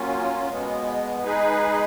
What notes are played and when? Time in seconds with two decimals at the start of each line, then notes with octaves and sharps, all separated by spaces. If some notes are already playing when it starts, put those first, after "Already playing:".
Already playing: F#3 A#3 C#4 F4
0.49 B2 G#3 B3
1.24 G#3 D#4 G#4 B4